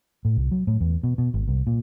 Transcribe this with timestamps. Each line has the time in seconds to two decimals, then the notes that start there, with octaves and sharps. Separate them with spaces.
0.25 A2
0.37 C2
0.51 F#3
0.67 A2
0.81 E2
1.04 B2
1.18 B2
1.34 G#1
1.47 C2
1.67 A#2